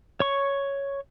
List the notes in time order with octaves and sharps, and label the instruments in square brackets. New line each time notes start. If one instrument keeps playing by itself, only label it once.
[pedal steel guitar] C#5 C#6